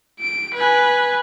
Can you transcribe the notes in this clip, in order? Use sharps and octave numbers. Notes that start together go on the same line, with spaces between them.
D7
B4 G#5